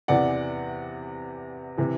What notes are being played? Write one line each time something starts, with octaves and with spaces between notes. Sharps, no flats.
E2 C3 E3 D5 F#5
C3 E3